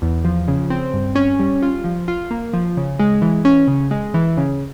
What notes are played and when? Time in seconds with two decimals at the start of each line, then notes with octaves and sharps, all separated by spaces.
0.02 E2
0.25 F3
0.48 C#3
0.70 C4
0.93 G2
1.15 C#4
1.39 G3
1.62 F4
1.84 F3
2.08 F4
2.31 A#3
2.53 F3
2.77 C#3
2.99 G#3
3.22 E3
3.45 C#4
3.68 C#3
3.91 G#3
4.14 E3
4.37 C#3